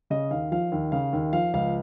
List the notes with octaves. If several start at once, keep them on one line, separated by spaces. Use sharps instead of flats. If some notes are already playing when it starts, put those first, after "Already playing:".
C#3 D#5
D#2 F5
F3 F5
D#2
C#3 F5
D#2
F3 F5
C#2 F5